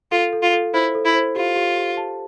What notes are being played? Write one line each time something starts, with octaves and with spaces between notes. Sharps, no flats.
F4 A4
A4
F4
A4
E4 C5
A4
E4
C5
F4 G4
G4
G4
A5